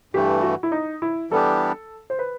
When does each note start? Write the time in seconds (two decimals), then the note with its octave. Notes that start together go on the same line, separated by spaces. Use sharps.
0.13 G2 E3 A3 G4
0.42 F#4
0.63 E4
0.72 D#4
1.02 E4
1.31 E3 G3 B3 D4 G4 A4
2.10 C5
2.19 B4